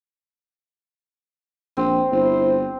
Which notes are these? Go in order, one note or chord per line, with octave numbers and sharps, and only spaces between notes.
A#1 C4
G1 E4 C5